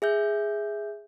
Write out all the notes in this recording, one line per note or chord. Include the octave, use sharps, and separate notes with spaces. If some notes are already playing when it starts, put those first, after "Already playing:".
G#4 E5 G6